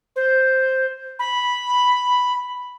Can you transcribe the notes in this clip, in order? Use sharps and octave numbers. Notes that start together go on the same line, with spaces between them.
C5
B5